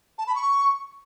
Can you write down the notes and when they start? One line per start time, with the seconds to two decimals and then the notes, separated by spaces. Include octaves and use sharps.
0.18 A5
0.27 B5
0.36 C#6